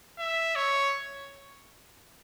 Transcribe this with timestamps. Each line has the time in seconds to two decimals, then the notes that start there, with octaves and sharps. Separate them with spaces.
0.18 E5
0.56 C#5